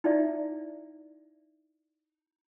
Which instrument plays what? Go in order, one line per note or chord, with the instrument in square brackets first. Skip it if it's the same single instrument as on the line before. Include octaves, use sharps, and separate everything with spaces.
[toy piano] D#4 E4 D5 E5